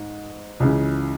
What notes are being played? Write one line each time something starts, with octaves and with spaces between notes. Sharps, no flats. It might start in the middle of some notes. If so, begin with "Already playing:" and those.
Already playing: G#2
C#2 C#3 E3